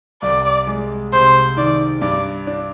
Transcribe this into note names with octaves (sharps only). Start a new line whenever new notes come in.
C2 D5
G#3
C3 C5
D#3 D5
G2 D5
D4